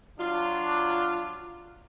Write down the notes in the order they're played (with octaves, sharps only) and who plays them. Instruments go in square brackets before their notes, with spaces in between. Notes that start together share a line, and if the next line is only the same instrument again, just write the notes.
[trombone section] F#3 D4 [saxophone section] F4